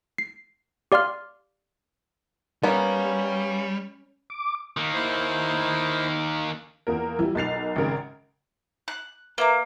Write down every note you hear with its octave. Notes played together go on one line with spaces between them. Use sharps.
C7
G4 D5 F5 C6 F6
G3 A#3 B3 C#4
D6
D#3 A#3
E4 C5
E2 A#3 A#4
E3 G3
B1 A#4 A6 C7 F7
G#1 C#3 A#4
F#6
A#3 B4 E5 A#5